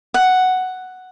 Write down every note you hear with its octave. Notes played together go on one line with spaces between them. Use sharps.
F#5